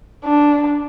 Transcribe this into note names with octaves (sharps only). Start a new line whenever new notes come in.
D4